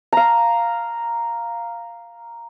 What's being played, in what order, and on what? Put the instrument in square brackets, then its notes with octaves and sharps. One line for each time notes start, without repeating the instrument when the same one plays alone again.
[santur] F5 A#5